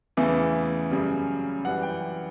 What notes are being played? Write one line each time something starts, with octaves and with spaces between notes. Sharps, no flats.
E2 C#3 E3 A3
F#2 C#3 G3
F#2 E3 G3 F#5
G5